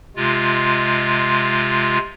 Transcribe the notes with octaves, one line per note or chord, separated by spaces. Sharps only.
C3 G#3 F4